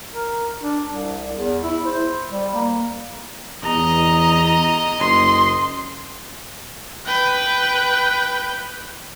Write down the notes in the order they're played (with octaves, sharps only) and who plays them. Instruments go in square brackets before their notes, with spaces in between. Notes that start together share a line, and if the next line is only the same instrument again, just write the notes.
[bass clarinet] A#4
D4
C2
E2
E4
C5
G3
A#3
[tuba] E2 [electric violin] D#5 [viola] A#5
[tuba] F#1 [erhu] C6
[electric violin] B4 G5